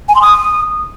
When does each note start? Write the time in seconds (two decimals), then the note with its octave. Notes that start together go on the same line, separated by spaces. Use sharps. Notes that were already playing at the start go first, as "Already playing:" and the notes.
0.09 G#5
0.15 C6
0.22 D#6